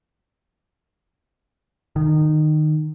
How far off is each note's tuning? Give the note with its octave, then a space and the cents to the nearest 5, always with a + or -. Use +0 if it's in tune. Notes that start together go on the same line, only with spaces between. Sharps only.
D#3 -20